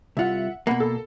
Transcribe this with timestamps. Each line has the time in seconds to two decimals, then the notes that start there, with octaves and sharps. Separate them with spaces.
0.17 C2 F4 E5 F#5
0.67 B2 A#3 F#5 B5
0.80 A4